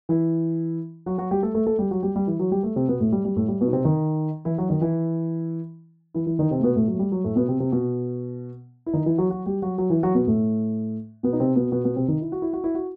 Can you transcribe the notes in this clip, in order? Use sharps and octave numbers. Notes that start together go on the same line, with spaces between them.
E3 E4
F#3 F#4
F#3 F#4
G3 G4
A3 A4
A3 A4
A3 A4
G3 G4
F#3 F#4
G3 G4
G3 G4
E3 E4
F#3 F#4
G3 G4
A3 A4
C3 C4
B2 B3
A2 A3
G3
G3
A2 A3
G3
B2 B3
D#4
C3 C4
D#3 D#4
E3 E4
F#3 F#4
D#3 D#4
E3 E4
E3 E4
E3 E4
D#3 D#4
C3 C4
A3
B2 B3
A2 A3
F#3
A3
G3
F#3
A2 A3
B2 B3
C3 C4
C3 C4
B2 B3
E4
D#3 D#4
E3 E4
F#3 F#4
F#3 F#4
G3 G4
F#3 F#4
F#3 F#4
E3 E4
F#3 F#4
B2 B3
A2 A3
B2 B3
D#4
C3 C4
B2 B3
B2 B3
B2 B3
C3 C4
D#3 D#4
E4
F#4
E4
F#4
E4
F#4